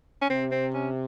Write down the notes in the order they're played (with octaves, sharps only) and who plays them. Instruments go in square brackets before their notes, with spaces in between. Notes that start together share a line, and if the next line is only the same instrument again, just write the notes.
[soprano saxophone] C#4
[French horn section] C3 [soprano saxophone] C4
[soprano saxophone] C4
C#4